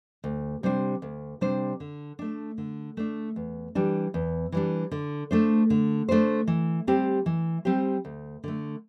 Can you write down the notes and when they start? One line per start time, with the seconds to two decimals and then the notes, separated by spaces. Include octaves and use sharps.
0.24 D2
0.63 C3 G3 D4 C5
1.02 D2
1.41 C3 G3 D4 C5
1.80 D3
2.19 A3 D4
2.58 D3
2.97 A3 D4
3.36 E2
3.75 E3 G3 D4
4.14 E2
4.52 E3 G3 D4
4.91 D3
5.31 A3 D4 C5
5.70 D3
6.09 A3 D4 C5
6.47 E3
6.87 G3 C4 G4 C5
7.26 E3
7.65 G3 C4 G4 C5
8.05 D2
8.44 D3 A3